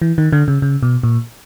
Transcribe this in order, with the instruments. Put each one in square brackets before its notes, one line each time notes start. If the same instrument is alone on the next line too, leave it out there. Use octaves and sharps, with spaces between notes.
[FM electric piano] E3
D#3
D3
C#3
C#3
B2
A#2